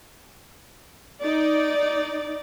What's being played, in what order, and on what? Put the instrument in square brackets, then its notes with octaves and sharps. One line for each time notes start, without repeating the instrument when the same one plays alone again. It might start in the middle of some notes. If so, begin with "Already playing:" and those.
[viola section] D#4 D5